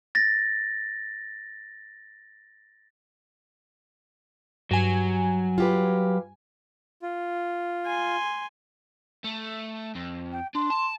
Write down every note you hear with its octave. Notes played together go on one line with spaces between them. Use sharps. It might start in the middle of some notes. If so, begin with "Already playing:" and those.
A6 A#6
G2 F#3 G#5
F4 G4 B4
F4
G#5 C6
A3
F2
G5
D4 C6
A5